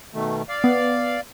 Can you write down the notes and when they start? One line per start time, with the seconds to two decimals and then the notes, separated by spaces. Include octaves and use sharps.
0.14 B2 D#3 A3
0.49 D5 F5
0.64 B3